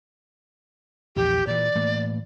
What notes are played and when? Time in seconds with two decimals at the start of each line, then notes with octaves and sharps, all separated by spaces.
1.16 A#1 E2 G4
1.47 A#2 E3 D5
1.75 A2 E3 A#3